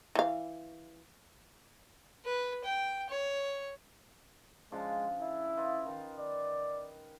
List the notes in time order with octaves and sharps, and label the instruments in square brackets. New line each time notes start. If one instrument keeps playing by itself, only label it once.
[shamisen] E3 F5
[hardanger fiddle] B4
G5
C#5
[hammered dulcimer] C#3 F3 D4 [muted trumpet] G#3
[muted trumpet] E4
[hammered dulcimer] F4 B4 D#5
D#3
[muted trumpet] D5